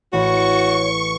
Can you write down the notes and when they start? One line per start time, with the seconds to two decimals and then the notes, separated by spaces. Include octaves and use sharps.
0.13 A1 F#4 C#5 B5 C#6